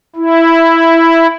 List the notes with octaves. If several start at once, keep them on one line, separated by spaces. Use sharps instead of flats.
E4